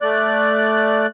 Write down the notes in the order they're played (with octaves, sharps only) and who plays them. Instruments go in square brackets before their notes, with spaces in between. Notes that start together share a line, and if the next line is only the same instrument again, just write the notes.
[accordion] A3 D5 F#6